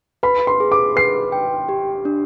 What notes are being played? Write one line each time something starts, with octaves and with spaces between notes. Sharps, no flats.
B4 B5
C6
G#4
D6
B4 C7
G5
G4
D4